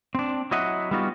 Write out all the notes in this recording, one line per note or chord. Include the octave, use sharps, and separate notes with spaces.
C4 D4
F#3 E4 D#5 E5 F#5
G3 B3 D#4 F4 F#4